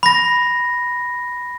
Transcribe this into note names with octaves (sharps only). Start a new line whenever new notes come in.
B5 A#6